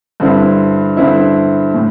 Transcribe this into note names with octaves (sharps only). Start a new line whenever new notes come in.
G2 D3 C4 E4
G2 D3 C4 E4
A2